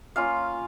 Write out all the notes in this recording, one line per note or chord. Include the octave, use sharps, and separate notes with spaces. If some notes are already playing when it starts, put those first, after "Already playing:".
A#3 C#4 F4 F5